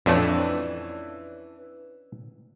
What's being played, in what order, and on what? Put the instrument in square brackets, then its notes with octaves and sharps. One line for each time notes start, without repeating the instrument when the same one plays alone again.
[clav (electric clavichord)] F2 A3 [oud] E3 C#4 D4